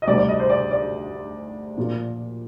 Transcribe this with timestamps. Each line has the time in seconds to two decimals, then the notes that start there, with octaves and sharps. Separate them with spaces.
0.02 D#5
0.07 D2 C3 G3 D5
0.18 D5
0.29 D#5
0.40 C5
0.50 D5
0.71 D5
1.77 A#2 F3 A#3